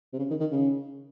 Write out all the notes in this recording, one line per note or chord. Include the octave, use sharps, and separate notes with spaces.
C3
C#3
D#3
D#3
C#3